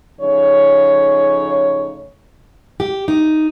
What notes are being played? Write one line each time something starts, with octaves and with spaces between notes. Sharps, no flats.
C#3 F3 A3 D#4 C#5
G4
D#4